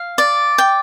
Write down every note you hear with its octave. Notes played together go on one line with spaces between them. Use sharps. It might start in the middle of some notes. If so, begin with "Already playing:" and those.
Already playing: F5
D5
G5